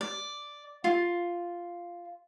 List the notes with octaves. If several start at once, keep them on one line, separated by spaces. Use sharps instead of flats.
D5
F4